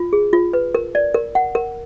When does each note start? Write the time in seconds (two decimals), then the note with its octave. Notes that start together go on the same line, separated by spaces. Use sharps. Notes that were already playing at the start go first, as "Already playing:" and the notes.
Already playing: F4
0.13 G#4
0.33 F4
0.53 B4
0.75 A#4
0.95 D5
1.14 A#4
1.35 F#5
1.55 A#4